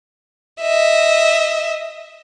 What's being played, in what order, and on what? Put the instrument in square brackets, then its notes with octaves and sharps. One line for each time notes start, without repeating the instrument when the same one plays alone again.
[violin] D#5 E5